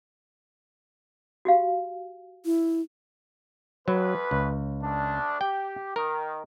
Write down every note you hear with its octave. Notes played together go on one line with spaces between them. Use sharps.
F#4 G4 F5
E4
F2 F#3 B4
C#2
D2 D4
G4 G5
D#3 A#4